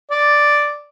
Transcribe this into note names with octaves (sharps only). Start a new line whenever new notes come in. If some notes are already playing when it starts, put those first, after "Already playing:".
D5